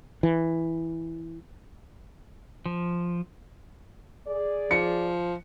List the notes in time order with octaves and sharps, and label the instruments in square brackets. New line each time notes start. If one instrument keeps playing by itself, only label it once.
[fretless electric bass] E3
[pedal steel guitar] F3
[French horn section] G#4 D5
[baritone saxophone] F3 [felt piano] C#7